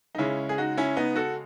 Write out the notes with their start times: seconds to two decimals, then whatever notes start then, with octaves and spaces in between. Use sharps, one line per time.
0.15 D#4
0.18 C#3 G#3 C#4 E4
0.49 G#4
0.58 D#4 F#4
0.78 C#4 E4
0.97 B3 D#4
1.16 F#4 A4